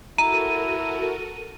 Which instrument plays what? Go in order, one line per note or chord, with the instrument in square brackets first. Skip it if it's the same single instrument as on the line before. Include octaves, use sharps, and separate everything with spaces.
[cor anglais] E4 [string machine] F#4 A4 A#4 [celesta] A#5 [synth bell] D#7